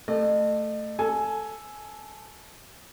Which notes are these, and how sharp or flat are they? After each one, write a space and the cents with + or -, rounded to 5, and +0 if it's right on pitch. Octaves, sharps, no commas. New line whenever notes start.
A3 +5 D#5 -35
A4 +0 G#5 +15